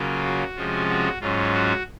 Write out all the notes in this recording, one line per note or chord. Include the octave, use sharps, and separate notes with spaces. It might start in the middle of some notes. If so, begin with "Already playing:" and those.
Already playing: C#3 F#3 A#3 C#4 F4
F#4
C3 F3 G#3 C#4 F4
F#4
G#2 F#3 C#4 F4
F#4